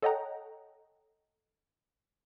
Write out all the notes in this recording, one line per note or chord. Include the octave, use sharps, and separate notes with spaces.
A4 C#5 D#5 F#5 G5 A#5